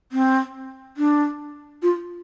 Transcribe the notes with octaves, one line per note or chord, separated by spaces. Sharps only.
C4
D4
F4